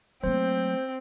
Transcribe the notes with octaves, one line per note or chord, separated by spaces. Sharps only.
F#3 A3 A#3 C4 C5